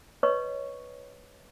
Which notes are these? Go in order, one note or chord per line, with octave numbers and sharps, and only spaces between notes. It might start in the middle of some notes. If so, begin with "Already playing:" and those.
B4 C#5 D#5 C#6